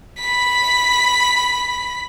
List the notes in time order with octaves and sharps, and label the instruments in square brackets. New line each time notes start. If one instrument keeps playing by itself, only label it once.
[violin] B5 B6